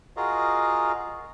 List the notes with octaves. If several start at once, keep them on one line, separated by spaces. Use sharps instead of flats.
F4 F#4 G#4 A#4 D#5 F5